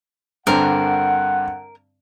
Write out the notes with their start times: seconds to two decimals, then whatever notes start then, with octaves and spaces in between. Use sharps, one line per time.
0.47 G2 D3 C4 A#4 F#5